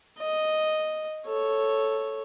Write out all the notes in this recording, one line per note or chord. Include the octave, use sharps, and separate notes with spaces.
D#5
A4 C#5